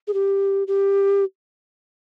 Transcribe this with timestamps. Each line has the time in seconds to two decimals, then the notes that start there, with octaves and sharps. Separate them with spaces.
0.08 G#4
0.14 G4
0.68 G4